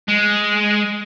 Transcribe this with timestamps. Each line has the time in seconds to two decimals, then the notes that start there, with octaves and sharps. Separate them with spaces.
0.08 G#3